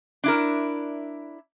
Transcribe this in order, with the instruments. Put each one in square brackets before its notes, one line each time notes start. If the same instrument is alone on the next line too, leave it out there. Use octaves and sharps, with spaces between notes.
[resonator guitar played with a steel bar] D4 E4 A#4